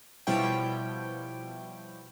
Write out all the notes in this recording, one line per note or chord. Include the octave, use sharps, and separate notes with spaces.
B2 F3 G3 E4 C#5 G5